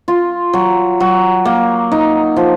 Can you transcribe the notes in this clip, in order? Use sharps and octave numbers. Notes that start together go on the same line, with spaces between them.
F4
F#3
F#3
A#3
D#4
F3